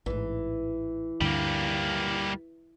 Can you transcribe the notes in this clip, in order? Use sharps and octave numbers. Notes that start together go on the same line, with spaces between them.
A1 G#2 E3
D2 G2 D3 G3 A#3